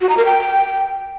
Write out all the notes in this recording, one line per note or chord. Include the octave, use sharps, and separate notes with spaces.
F#4
A#5
A#4
G5